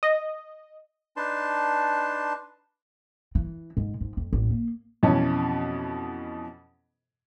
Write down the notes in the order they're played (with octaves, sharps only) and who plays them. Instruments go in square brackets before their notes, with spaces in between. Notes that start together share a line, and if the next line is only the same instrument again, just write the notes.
[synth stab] D#5
[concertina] D4 D#4 B4 A5 C6
[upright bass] E3
G#2
G#2
F2
A1
A#3
[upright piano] F2 B2 E3 C#4